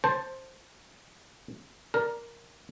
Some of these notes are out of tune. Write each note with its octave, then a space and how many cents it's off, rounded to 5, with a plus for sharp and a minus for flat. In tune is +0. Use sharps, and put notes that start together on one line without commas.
C5 +5 A5 +10
A#4 +5 D5 +0